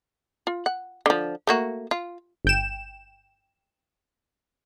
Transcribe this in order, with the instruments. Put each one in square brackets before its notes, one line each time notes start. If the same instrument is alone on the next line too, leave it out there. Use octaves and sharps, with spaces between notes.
[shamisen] F4
F#5
D3 F3
A3 A#3 F#4
F4
[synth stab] G1 G5 E7